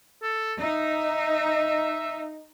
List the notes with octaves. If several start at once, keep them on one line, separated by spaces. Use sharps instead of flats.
A4
D#4 E5